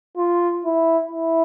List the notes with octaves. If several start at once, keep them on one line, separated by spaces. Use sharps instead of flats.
F4
E4
E4